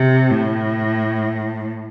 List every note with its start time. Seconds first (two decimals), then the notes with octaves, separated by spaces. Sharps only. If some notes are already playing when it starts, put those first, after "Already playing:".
Already playing: C3
0.30 A2